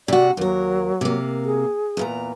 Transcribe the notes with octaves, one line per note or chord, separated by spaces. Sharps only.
C3 F#4 D5
D#2 F#3 A#4
C3 A#3
G#4
E2 A#2 A#5